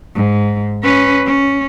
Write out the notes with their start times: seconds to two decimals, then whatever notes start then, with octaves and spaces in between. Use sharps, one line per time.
0.15 G#2
0.83 C#4 B4
1.26 C#4